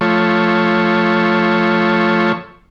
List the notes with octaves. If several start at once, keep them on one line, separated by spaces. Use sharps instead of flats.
F3 A3 C#5